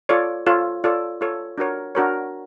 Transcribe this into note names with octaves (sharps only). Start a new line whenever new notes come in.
F4 A4 C#5 D5
F4 A4 C#5
F4 A4 C#5 D5
F4 A4 C#5
D4 F#4 A#4 C#5
D4 F#4 A#4 C#5